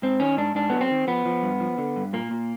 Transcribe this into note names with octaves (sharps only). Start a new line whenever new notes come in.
G#2 C4
D#3 C#4
G#2 D4
G#2 D4
F#3 B3
C4
D#3
F3 B3
F3
G2
F3
D3
G2
A#2 A#3
A#2